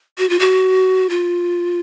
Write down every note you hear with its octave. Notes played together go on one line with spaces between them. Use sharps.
F#4
F4
F#4
F4